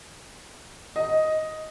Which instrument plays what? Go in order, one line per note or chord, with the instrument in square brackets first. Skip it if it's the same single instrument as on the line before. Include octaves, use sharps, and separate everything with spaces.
[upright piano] D#5